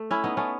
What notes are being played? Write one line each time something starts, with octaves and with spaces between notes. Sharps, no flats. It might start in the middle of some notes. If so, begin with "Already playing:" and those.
Already playing: A3
C#4 E4
B3 D#4
A3 C#4